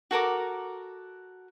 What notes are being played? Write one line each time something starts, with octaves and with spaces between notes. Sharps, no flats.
F#4 A4 A#4 D6